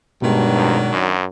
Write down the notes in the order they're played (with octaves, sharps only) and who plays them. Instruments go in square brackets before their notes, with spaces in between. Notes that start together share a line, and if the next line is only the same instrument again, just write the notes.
[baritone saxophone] G2 [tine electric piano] B2 G#3 [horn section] D#3 F#3 D4
[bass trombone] F2
F#2